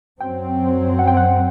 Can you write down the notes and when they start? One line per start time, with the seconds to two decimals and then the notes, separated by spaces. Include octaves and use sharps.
0.20 F#2 F#3 C4 G5
0.99 F#5
1.07 G5
1.17 F#5